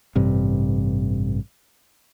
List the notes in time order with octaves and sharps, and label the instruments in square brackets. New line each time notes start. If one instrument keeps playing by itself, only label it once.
[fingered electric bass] A1 G2 C3